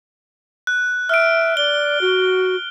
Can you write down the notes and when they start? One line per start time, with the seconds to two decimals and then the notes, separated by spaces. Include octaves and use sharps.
0.67 F#6
1.09 E5 F6 D7
1.57 D5 G7
2.01 F#4